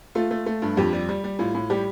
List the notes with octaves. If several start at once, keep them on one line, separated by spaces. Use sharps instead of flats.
A3 F4
A3
A3
G2
F2 G4
G3
G3
G3
A2 F4
A2
G3 G4